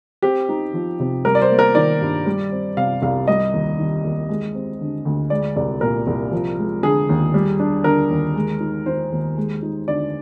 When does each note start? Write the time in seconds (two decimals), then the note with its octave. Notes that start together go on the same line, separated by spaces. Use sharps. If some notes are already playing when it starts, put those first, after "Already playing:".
0.22 C4 G4
0.49 D#4
0.73 F3
1.00 C3
1.25 G3 A#4
1.35 D5
1.42 C5
1.50 A#3
1.59 A#4
1.75 D#3 D5
2.01 G2
2.26 G3
2.52 C4
2.77 C3 F5
3.02 C2 F5
3.28 G3 D#5
3.53 D#2
3.79 D#3
4.04 D#2
4.29 G#3
4.55 C4
4.80 D3
5.05 D2
5.30 G#3 D5
5.56 C2 D5
5.81 A#2 A#4
6.07 C2
6.32 F3
6.58 G#3
6.83 D3 G#4
7.09 D#2
7.34 G3
7.60 D4
7.84 D3 A#4
8.10 D#2
8.36 G#3
8.60 D#4
8.86 D#3 C5
9.12 D#2
9.37 G#3
9.62 D#4
9.88 D3 D5